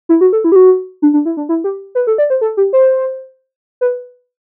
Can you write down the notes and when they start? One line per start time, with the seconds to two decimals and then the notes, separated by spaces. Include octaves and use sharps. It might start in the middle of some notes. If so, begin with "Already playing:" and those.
0.09 E4
0.21 F#4
0.33 A4
0.44 E4
0.52 G4
0.56 F#4
1.02 D4
1.13 D4
1.25 E4
1.37 D4
1.49 E4
1.64 G4
1.95 B4
2.07 A4
2.18 D5
2.30 C5
2.41 A4
2.57 G4
2.73 C5
3.81 B4